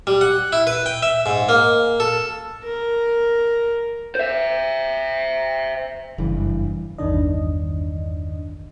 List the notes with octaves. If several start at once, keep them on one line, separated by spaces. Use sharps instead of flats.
G3
F#5
E4
B4
G5
E5
G#2
A#3
A4
A#4
C5 E5
F#1 G2 E3
A1 E2 G2 D#3 D4 D#5